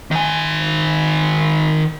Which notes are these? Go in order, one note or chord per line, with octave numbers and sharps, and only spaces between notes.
D#3 G#5